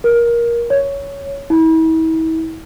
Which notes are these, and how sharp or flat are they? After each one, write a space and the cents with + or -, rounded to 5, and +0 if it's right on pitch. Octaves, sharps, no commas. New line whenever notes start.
A#4 +15
C#5 +10
E4 -40